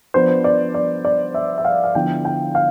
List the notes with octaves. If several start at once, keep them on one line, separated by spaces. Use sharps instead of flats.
F3 B3 D4 C5
D5
D5
D5
E5
E5
F5
F5
D3 F3 B3 E4 G5
G5
F5